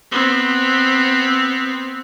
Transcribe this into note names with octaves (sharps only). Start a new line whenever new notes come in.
B3 C4